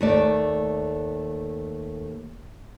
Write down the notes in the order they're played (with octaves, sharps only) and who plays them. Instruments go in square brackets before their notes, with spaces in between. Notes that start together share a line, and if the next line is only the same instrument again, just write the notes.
[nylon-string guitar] D#2 A3 D5